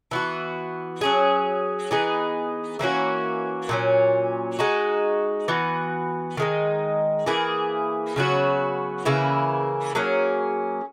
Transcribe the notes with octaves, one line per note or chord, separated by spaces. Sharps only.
E3 B3 F#4
F#3 C#4 G#4
E3 B3 D#4 G#4
E3 A#3 C#4 F#4
A#2 F#3 C#4
G#3 D#4 F#4
E3 B3 F#4
D#3 G#3 D#4
E3 A#3 E4 G#4
C#3 F#3 B3 F#4
C#3 E3 A#3 E4
F#3 A#3 C#4 G#4